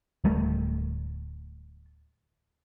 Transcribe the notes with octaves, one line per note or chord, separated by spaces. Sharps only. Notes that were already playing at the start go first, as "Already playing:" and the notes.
D1 G3 A3